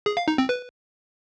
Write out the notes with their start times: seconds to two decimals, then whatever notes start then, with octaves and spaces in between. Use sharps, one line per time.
0.06 G#4
0.17 F5
0.28 D#4
0.38 C4
0.49 B4